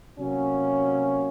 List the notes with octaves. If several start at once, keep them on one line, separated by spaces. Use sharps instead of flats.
C3 F#3 A#3 C#4